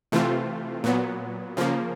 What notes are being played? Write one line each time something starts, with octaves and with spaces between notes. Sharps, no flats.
C3 E3 A3 C4 F4
A#2 F#3 B3
C#3 F3 A#3